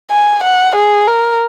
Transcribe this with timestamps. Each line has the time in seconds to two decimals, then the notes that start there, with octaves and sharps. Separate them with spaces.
0.11 G#5
0.43 F#5
0.75 G#4
1.07 A#4